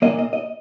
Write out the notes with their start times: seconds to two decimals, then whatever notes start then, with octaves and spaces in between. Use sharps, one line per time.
0.02 A#2 A#3 D#5
0.18 D#5
0.33 D#5